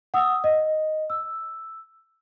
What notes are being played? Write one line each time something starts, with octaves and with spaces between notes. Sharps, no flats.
F#5 D#6 E6
D#5
E6